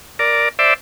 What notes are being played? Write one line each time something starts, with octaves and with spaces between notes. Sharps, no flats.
A#4 D5
C5 D5 E5